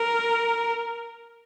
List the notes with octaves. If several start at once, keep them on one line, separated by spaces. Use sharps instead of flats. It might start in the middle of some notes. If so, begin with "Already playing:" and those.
Already playing: A#4